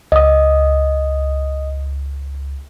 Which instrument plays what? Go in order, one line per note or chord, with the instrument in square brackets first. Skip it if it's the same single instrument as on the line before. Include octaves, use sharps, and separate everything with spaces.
[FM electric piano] C#2 [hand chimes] D#5 D#6